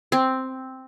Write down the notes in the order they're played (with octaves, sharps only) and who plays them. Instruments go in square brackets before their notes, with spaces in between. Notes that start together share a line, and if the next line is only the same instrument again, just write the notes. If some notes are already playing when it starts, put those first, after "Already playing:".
[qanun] C4